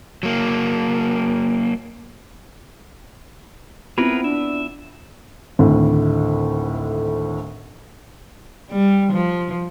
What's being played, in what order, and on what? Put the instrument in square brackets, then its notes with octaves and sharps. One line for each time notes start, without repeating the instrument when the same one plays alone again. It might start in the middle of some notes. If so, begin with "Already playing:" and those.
[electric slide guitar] F#3 A#3
[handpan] B3 E4 [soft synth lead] C4 [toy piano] F4 [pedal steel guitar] G#4 A#4 B4
[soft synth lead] D4 [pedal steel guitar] E5
[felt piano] G#1 D2 A2
[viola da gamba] G3
F3